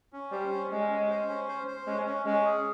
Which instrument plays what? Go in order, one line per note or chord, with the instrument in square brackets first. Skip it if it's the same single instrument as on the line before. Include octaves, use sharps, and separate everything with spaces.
[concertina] C#4
[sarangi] G3 [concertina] C5
[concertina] C#4
[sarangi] G#3 [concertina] C#4
[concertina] C#4
C5
C#4
C5
C5
[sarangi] G#3 [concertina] C#4
[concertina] C#4
[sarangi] G#3 [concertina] C#4
[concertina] G#4